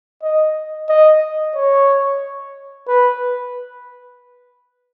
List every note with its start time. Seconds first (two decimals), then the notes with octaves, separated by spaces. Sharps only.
0.23 D#5
0.89 D#5
1.56 C#5
2.88 B4